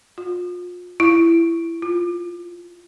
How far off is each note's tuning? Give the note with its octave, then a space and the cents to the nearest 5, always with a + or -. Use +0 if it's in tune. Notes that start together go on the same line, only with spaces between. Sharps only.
F4 +35
E4 +20
F4 +0